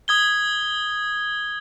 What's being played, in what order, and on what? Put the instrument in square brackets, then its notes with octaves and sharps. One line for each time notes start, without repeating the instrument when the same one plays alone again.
[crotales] D#6 G#6 G7